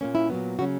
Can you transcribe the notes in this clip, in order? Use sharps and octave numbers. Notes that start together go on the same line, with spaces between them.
A#2 A#3 C#4
E4
A#2 F#3 B3
C#3 F#3 C#4 F#4